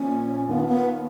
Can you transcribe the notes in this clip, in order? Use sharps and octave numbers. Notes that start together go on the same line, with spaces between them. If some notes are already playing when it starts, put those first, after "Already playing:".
Already playing: A#1 A#2 C#4
D#2 D#3 A#3 B3 F4
B3